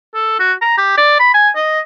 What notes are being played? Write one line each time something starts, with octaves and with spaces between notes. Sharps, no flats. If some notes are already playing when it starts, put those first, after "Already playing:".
A4
F#4
A#5
G4
D5
B5
G#5
D#5